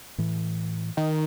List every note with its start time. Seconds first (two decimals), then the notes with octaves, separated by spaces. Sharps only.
0.18 A2 E3
0.97 D#3